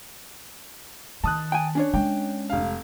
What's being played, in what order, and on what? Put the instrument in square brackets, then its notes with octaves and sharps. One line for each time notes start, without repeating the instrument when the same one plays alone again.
[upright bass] D#3 [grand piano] A5 D#6 F#6
[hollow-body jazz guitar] G5 G#5
C#4 D4 C#5
[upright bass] G#3 [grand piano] G5
[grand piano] F1 F5